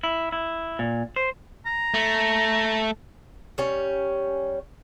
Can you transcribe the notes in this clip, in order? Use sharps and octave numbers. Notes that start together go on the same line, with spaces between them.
E4
E4
A#2
C5
A#5
A3
G3 C#4